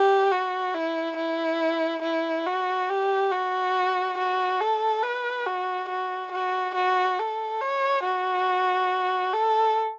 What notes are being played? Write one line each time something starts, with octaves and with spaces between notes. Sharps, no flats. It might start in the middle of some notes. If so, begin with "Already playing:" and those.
Already playing: G4
F#4
E4
E4
E4
F#4
G4
F#4
F#4
A4
B4
F#4
F#4
F#4
F#4
A4
C#5
F#4
A4